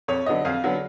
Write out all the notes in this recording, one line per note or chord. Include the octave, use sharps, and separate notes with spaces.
F2 C#5
D3 F#3 B3 D#5
F2 F5
D3 F#3 B3